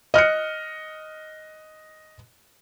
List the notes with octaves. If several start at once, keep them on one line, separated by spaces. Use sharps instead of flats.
D#5 F6 F#6 C#7